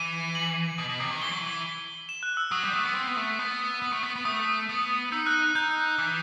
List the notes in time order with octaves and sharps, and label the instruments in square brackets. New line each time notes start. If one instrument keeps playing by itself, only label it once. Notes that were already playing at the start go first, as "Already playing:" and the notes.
Already playing: [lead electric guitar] E3 [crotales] D#7
[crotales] F#7
[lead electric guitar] B2
B2
C3
D#3
[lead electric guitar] E3 [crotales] G7
[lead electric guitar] F#3
E3
[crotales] E7
F#6
E6
[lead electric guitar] F#3 [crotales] D#6
[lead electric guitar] G3
A3
B3
C4
B3
A3
B3
B3
A3
B3
B3
[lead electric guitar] A3 [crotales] D#6
[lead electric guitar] B3
[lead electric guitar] D#4 [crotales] E6
[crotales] F#6
F#6
[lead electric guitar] D#4 [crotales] G6
[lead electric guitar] E3